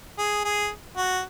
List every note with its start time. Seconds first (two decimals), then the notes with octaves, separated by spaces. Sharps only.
0.18 G#4
0.45 G#4
0.97 F#4